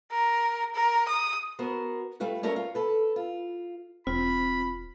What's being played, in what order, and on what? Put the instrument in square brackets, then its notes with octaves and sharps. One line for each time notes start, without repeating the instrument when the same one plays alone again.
[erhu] A#4
A#4
D#6
[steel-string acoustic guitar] B3 F#4 A#4 C5
G3 A3 F4 B4
G3 A3 C#4 F4 A#4 C#5
F4
A4 B4
F4
[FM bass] E1 [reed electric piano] C4 [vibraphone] F4 [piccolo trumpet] B5